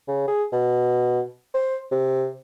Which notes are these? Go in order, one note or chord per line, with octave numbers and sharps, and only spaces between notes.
C#3
G#4
B2
C5
C3